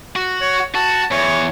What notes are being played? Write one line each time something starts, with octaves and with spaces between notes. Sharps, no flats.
F#4
C#5
F#4 A5
E2 C#5